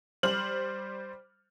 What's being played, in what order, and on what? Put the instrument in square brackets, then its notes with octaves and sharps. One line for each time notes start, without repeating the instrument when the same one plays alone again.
[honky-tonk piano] G3 C5 F6 F#7